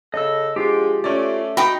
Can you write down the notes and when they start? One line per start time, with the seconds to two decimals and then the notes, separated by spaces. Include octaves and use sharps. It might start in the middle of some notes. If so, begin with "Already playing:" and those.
0.14 C#3 A4 D#5 E6
0.56 D3 F3 G#3 F4 G4
1.04 A3 C#4 D5
1.57 D#4 F#4 G5 B5 D#6